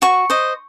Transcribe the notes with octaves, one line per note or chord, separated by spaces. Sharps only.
F#4 C#6
C5 D#5